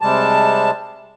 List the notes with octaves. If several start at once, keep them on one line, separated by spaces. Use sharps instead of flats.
C3 G3 G#3 A5